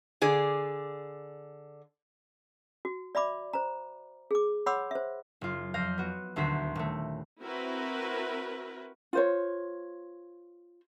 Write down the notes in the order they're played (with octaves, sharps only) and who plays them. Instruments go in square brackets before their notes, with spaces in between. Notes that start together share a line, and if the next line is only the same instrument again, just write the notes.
[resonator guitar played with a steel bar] D3 G#4 D5
[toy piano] F#4
D5 E5 B5 D6
C5 A#5
G#4 D6
C#5 F#5 B5 C6 D6 E6
C5 E5
[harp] F#1 F4
F2 F5 G6 A#6
B3 F#4
D#1 D2 F#4 C5 B6
D#1 A3
[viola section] C4 E4 F#4 A#4 B4
[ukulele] F4 C5 C#5